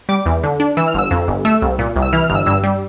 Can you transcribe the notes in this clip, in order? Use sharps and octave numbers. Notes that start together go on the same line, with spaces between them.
G3 D6
E2
D3
D4
E3 E6
F6
G1 E6
F2
G1
A3 E6
C2
A#2
C2
E6
E3 F6
F6
G1
E6
G2 E6
G3